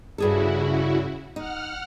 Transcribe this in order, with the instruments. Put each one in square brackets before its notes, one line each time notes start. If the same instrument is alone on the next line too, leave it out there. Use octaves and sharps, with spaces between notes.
[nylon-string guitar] G2 G#4 A4 [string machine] C#3 E4 F#4
[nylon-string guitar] D#4 [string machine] F#5 F6